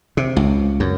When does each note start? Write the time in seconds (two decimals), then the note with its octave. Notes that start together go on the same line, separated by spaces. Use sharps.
0.17 C3
0.36 C#2
0.80 F#2